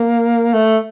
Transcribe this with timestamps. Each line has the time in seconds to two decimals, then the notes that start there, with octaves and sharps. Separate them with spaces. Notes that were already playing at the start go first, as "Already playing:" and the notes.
Already playing: A#3
0.53 A3